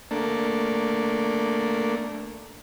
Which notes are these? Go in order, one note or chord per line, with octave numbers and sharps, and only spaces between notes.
A3 A#3 D4